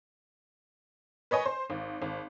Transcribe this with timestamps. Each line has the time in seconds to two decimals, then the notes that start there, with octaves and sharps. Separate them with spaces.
1.31 B4 C#5 D#5 G#5
1.46 C5
1.70 G#1
2.02 G#1